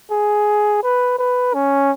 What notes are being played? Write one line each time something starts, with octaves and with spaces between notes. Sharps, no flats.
G#4
B4
B4
C#4